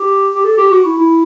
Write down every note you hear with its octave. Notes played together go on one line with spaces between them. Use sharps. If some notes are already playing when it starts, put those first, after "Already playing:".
Already playing: G4
G4
A4
G4
F#4
E4
E4